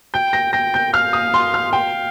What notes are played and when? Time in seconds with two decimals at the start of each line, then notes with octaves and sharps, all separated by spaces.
0.14 G5 G6
0.33 A#6
0.53 G5 A#6
0.74 G6
0.93 F5 F6
1.13 D#6
1.34 C6
1.54 F6
1.73 F5 G5